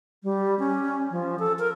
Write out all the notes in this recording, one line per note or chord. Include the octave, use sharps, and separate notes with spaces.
G3
C#4
F3
A4
A#4